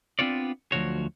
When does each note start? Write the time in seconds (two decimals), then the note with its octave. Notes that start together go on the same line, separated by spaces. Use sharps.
0.19 B3 C4 D4 F4 C#5 D5
0.72 D2 C3 F3 F#3 F#4 C#5